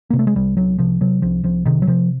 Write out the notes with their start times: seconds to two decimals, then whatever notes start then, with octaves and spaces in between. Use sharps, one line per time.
0.10 C3 A#3
0.19 A3
0.27 G#3
0.36 C2 G3
0.57 C2 F#3
0.78 C3 F3
1.01 C3 F#3
1.22 C2 F3
1.44 C2 F3
1.66 C3 D#3
1.82 F#3
1.87 C3 F3